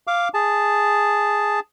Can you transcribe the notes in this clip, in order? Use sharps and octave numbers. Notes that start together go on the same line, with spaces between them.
F5 D6
G#4 A5